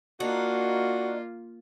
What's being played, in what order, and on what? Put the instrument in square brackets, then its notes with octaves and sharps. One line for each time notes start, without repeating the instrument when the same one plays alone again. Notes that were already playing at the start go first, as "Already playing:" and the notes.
[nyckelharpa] A#3 F4 [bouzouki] D4 D#4 [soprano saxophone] F#4